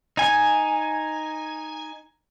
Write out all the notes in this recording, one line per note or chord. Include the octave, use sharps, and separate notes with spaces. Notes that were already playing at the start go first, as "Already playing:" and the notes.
D#4 G#5